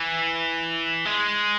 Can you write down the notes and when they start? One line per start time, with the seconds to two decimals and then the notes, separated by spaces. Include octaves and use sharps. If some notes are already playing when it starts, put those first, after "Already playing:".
Already playing: E3
1.05 G#3